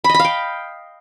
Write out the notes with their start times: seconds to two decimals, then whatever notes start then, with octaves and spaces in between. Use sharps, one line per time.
0.04 B5
0.09 D#5
0.14 B5
0.20 F5
0.25 G5